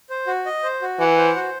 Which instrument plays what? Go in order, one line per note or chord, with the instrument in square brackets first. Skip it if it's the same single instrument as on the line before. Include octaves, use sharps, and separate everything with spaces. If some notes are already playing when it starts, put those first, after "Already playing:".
[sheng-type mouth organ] C5
F#4
D#5
C5
F#4
[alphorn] E3 [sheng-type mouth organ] F#5
[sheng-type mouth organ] C5
F#4